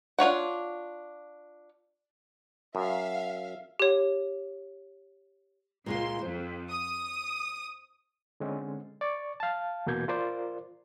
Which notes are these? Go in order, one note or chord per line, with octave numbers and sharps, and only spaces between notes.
D4 F4 C#5 F#5
F#2 E5 F5
G4 C#5
C#2 A#2 G#3 F4 C6
F2 C5
D#6
D3 G#3 C4 C#4
D5 C#6
F5 A5
E2 B2 A#3 G6 G#6
F4 A#4 C5 D5